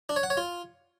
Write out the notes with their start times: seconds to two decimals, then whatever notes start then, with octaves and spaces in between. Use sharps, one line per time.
0.09 D4
0.16 C#5
0.23 F#5
0.30 C#5
0.37 F4